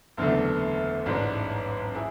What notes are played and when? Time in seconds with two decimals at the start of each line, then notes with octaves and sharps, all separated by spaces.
0.17 F#1 E2 D3 A3
1.06 A1 G#2 G#3 D4
1.95 E4 G#4